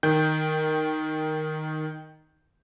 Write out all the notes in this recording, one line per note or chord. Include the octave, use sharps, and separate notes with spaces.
D#3 G5 G6